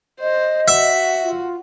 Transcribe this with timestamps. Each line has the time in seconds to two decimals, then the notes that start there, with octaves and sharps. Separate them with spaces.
0.21 C5 D#5
0.68 F#4 E5
1.23 F4